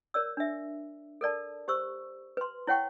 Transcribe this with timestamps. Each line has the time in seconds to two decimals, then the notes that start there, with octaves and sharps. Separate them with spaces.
0.14 A#4 C#5 D5 E6
0.37 D4 E5
1.21 A4 A#4 D5 A5
1.68 G4 C5 C#6 E6
2.37 B4 C6
2.67 E4 C#5 F#5 G5 C#6